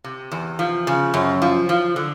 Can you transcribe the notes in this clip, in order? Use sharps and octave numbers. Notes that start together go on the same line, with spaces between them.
C3
E2
F3
C#3
F#2
F3
F3
D3